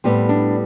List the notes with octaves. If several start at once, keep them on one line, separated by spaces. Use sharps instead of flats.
A2 G3 B3 C4
D4